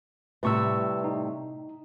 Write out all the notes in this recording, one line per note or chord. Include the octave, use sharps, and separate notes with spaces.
A2 C3 G3 B4 C#6 E6
D#4